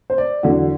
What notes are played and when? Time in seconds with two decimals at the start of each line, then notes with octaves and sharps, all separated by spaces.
0.10 C5
0.18 D5
0.43 E2 D3 F#3 F#4